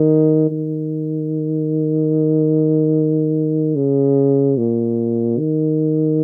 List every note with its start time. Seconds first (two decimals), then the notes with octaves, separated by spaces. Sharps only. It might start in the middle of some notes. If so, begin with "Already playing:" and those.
Already playing: D#3
0.51 D#3
3.76 C#3
4.57 A#2
5.38 D#3